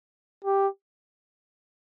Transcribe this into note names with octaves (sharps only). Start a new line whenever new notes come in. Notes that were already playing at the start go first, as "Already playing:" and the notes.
G4